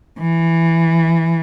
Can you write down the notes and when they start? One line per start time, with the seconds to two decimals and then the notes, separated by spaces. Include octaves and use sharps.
0.19 E3